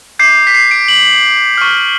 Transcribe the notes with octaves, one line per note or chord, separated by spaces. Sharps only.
D6 G6 C7
B6
C7
D7
F#7
C#6 F6